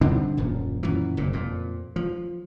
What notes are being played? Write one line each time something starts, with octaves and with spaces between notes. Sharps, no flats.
D3 G3 C4 D4
D#1 F#2 A#2
F#2 A#2 E3
F#1 A#2
F2 A#2
F3